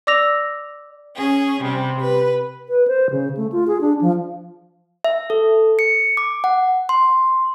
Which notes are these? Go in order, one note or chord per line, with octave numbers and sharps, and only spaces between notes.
D5 D6 E6 A#6 F7
C#4 G#4
C3 G3
B4
B4
C5
C#3
A3
F4
G#4
D4
F3
E5
A4
C#7
D6
F#5
C6